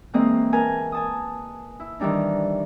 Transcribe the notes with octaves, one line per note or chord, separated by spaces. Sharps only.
E3 G#3 A#3 C4 D#5
A#4 B4 G#5 A5
G#5 A5 D#6
E4
D#3 E3 G3 D4 D#4